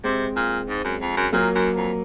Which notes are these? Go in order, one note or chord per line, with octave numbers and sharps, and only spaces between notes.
C3 G#3 C4
A#2
G#2
F#2
F2
F#2
A#2 F#3 A#3
F#2
F2